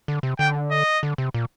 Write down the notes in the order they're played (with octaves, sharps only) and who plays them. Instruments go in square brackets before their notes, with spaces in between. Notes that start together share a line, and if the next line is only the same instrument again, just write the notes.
[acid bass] D3
C3
[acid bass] D3 [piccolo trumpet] G5
[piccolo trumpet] D#5
[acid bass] D3
C3
A#2